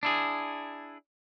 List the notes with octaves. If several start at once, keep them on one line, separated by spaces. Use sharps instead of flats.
D4 E4 G#4